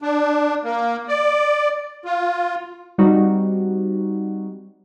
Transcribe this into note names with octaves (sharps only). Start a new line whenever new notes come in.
D4
A#3
D5
F4
G3 C4 D#4 F#4